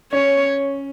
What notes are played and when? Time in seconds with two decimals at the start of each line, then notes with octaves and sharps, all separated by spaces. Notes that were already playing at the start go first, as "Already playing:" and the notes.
0.12 C#4 C#5